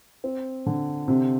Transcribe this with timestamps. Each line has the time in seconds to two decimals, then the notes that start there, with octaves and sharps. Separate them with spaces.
0.24 C4
0.66 D3
1.08 C3